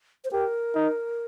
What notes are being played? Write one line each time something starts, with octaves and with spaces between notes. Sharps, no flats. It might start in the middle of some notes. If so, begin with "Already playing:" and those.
C5
G4 A#4
D#4